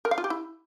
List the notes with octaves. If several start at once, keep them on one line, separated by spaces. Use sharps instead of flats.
A#4
F5
F4
G4
E4